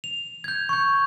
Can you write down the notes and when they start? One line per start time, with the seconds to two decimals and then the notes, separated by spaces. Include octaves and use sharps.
0.04 F7
0.44 G6 G#6
0.69 C#6 G6